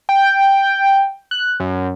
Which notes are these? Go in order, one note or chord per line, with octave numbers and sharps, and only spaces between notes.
G5
F#6
F#2